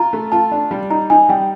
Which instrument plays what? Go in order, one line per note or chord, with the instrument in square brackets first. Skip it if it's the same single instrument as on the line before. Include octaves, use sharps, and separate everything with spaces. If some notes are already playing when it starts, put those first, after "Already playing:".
Already playing: [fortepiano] F4 [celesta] A#5
[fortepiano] A3
[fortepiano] F4 [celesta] A5
[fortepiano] D4
G3
[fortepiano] D#4 [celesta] A#5
[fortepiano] D#4 [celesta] G#5
[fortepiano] G3 [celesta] G5